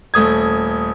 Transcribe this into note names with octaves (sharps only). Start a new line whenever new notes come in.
D#1 A3 D#6 G#6